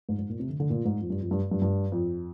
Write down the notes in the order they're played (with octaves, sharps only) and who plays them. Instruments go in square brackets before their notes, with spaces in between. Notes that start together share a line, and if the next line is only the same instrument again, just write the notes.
[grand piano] G#2
G#2
A#2
C3
D3
D3
A#2
G#2
F2
G2
F2
G2
G2
G2
F2